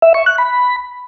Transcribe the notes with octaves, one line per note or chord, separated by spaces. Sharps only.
E5
C#6
F#6
B5